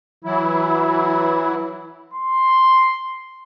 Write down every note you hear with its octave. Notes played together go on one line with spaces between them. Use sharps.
E3 F#3 E4
C6